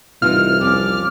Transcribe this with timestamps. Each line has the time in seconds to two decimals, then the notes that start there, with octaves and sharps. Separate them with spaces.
0.22 C2 E3 D#4 F4 F6
0.61 F2 C#4 D6